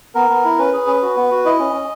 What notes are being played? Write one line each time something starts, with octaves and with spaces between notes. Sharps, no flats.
B3 A#4
B3
E4
C#4 B4
G#4
C#4
F#4
B3
F#4
E4 D#5
C#4
C#4